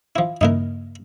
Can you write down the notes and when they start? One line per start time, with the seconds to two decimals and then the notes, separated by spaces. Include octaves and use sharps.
0.16 F3 E4
0.41 G2 C#3 A#3 D#4 E4 A#4